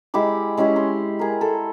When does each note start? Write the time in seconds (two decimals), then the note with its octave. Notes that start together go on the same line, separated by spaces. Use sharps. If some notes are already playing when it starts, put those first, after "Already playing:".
0.14 G#3 E4 G4 D6
0.57 G#3 C#4 E4 G4
0.76 C6
1.19 G#4 A#4
1.41 A4